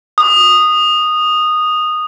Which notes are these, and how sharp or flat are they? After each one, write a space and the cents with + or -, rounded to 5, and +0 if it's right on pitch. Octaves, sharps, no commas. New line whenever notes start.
D#6 -10